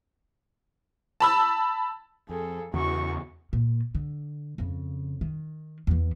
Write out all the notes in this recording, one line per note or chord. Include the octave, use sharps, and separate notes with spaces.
A5 B5 E6
F2 G#4 A4
E2 C#3 E3 F#4 C#6
A#2
D3
F2 C#3
D#3
E2 E3